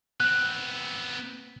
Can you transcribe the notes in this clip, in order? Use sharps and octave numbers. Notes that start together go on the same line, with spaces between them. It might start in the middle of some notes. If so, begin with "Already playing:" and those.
B3 C4 F#6